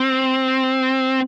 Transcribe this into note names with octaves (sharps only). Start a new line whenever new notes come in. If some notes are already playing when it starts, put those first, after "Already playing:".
Already playing: C4